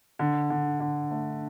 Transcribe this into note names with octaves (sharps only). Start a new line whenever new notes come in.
D3
D3
D3
A3